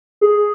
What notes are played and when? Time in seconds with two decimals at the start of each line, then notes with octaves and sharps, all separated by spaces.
0.21 G#4